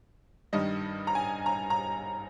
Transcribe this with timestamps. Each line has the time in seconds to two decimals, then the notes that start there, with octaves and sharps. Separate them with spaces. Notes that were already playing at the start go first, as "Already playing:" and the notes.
0.53 G2 D#3 G3 D#5
1.07 A#5
1.15 G#5
1.46 A#5
1.70 A#5